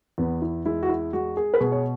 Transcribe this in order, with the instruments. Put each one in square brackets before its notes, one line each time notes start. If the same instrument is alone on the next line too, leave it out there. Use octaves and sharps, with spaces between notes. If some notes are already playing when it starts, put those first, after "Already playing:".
[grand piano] E2 B3
E4
G#3 E4
F#4
E4
G#3 F#4
G#4
B4
B2 G#4
C#5